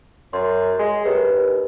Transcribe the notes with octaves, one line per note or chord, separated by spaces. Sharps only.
F#2 C6
G#3
F#2 G4 B4
D#2